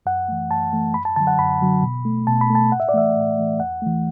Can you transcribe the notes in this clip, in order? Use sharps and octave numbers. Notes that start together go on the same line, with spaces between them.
F#2 F#5
E3 A3
F#2 A5
E3 A3
F#2 B5
A5
D3 F#3 A5
F#5
F#2 B5
D3 F#3
B2
A3
B2 A5
B5
A3
A5
A2 F#5
E5
D5
E3 A3 E5
A2
E3 A3
E2 F#5
E3 A3